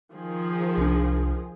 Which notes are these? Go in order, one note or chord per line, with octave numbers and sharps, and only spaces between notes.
D#3 F3 G#4
C2 D4